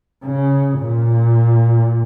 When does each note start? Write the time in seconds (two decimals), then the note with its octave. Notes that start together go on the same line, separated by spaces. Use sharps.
0.24 C#3
0.77 A#2